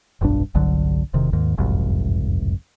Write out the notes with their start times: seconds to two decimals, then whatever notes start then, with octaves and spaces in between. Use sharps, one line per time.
0.21 F1 B1 G2 D4
0.55 G1 C2 D3 F#3
1.14 E1 C3 D#3
1.33 D#2 G#2 D#3
1.58 F#1 C2 F2 G#2